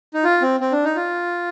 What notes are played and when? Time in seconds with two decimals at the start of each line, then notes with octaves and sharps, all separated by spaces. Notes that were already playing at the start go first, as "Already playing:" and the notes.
0.14 D#4
0.24 F4
0.42 C4
0.60 C4
0.72 D4
0.84 D#4
0.96 F4